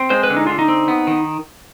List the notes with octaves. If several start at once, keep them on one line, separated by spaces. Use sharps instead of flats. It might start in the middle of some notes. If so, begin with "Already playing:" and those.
Already playing: C4
G#3 C5
B4
D3
D#4
D3 F4
D#4
C4
B3
D#3